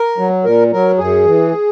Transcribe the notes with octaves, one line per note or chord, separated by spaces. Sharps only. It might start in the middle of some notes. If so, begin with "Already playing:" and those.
Already playing: A#4
F#3
A#2 A#4
F#3 A#4
F#2 G#4
E3